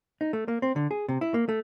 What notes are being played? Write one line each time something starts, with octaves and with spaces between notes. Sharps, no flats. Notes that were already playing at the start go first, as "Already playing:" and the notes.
D#4
A3
A#3
C4
D3
G#4
C3
E4
A#3
A3